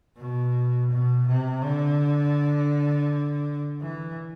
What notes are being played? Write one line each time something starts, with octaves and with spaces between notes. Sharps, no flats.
B2
B2
C3
D3
E3